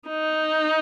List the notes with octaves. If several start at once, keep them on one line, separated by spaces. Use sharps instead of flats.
D#4